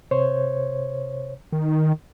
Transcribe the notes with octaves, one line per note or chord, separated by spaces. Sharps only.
C3 C5 C#5
D#3